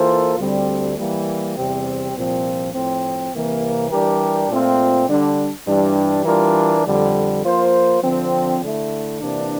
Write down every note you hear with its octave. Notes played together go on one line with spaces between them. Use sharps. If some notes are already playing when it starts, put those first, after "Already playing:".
Already playing: E3 A#3 F4 A4 C5
D2 D3 G3 C4
E3 G3 A#3
E2 C3 G3 C4 G4
C2 A#2 F3 C4
A2 F3 C4
C2 C3 E3 A#3
E3 G3 D4 G4 A#4
A#2 A3 C4 F4
D3 G3 D4
G2 E3 G3 D4
E3 G3 D4 F4 A#4
F2 D3 G3
F3 A#3 F4 C5
D3 F3 C4
D3 A3 E4
C3 E3 A#3 D4